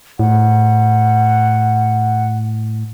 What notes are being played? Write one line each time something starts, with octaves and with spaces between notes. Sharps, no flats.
A2 F#5